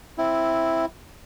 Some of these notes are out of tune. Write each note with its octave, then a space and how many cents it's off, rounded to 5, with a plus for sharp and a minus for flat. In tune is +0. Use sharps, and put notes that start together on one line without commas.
C4 +0 E4 +0